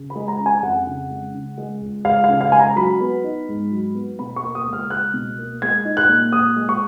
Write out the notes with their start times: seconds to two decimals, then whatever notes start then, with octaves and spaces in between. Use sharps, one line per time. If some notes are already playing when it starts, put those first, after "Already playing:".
Already playing: C#3
0.10 B5
0.15 G#3
0.28 A#5
0.40 C#4
0.46 G#5
0.62 F2 F#5
0.87 C#3
1.10 G#3
1.34 C#3
1.58 G#3
1.81 C#2
2.05 C#2 F5
2.24 F5
2.29 C#3
2.41 F5
2.52 G#3 G#5
2.59 A#5
2.76 F#3 B5
3.01 B3
3.24 D#4
3.48 G#2
3.71 F#3
3.95 B3
4.19 B2 B5
4.36 C#6
4.43 A#3
4.55 D#6
4.66 C#2
4.73 F6
4.90 C#2 F#6
5.14 B2
5.38 A#3
5.62 G#3 G#6
5.85 D#4
5.97 F#6
6.09 A#2
6.32 A#2 D#6
6.56 G#3
6.69 C#6